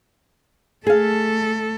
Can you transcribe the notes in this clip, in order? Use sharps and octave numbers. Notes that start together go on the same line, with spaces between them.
A3 G#4 A4 F5